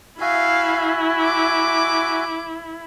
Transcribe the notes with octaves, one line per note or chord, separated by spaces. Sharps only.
E4 F#4 E5 F5 G#5
D6